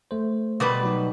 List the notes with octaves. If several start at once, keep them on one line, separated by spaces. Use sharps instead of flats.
A3 C5
B2 G3 B4 C6 D6 A6
F#3 D#4